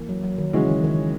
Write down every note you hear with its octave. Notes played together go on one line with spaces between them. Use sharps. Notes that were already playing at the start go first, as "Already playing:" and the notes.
Already playing: E3 A#3
F#3
F#3
D#3
C#3 E3 G#3 C#4 F#4
D#3
D#3